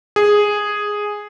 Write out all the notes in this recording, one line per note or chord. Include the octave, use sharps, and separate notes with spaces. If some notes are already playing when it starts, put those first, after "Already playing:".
G#4